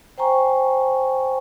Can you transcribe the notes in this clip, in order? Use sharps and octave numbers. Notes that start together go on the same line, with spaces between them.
C5 G5 G#5 A#5 C#6